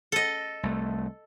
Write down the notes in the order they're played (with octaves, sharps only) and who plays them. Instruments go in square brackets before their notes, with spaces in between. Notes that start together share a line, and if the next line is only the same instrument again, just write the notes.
[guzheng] A4 D#5
[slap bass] C2 A3